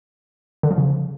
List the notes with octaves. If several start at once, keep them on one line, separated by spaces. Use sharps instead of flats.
D3
F3
C#3